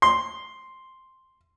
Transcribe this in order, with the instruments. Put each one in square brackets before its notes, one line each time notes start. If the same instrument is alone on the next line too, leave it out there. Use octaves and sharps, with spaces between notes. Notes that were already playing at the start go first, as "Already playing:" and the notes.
[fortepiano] C6